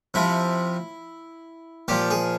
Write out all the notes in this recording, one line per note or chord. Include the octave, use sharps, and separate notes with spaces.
C3 F3 E4
A#2 F3 G4
G#4